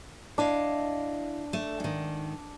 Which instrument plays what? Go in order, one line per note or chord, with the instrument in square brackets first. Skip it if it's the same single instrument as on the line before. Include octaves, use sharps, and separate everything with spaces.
[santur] D4 [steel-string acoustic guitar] E4 D#5 F5
[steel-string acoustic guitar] A3
G#2 D#3